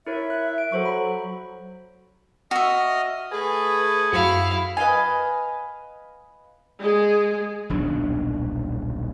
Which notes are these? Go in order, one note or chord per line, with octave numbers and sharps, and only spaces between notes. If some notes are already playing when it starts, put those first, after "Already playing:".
E4 A#4 C#5 E5
F#6
D7
F#3 A4 C5 C#6
B5
F#4 D#5 E5 D#6 F6
A3 G#4 B4
F#2 E4 F#4 F5 C#7
B4 D#5 F5 G#5
G#3 G#4
D#1 B1 F#3 D4